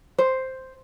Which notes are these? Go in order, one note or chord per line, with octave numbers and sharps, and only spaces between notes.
C5